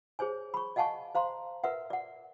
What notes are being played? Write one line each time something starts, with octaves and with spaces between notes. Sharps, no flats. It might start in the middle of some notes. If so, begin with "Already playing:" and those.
G#4 C5 C#5 G#5
B5 C#6
D#5 F5 F#5 G#5 A5 C#6
C5 F5 A#5 C6
A#4 B4 E5 F#5
D5 F#5